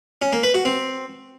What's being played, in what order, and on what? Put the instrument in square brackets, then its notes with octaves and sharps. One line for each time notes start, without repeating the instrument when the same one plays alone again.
[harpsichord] C#4
A#3
B4
F#4
C4